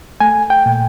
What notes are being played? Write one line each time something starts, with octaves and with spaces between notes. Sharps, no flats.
A3 G#5
G5
A#2